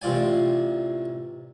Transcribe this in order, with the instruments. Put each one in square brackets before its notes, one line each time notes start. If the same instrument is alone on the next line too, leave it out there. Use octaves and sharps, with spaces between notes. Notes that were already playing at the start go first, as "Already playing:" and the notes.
[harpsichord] A1 C3 F4 D5 G#5